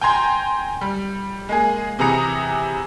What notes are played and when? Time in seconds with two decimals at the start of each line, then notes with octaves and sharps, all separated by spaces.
0.01 G5 G#5 A#5 C6 G#6
0.81 G3
1.49 G#3 A#3 G#4
1.99 C3 E3 G#4 A#5 D#6 C#7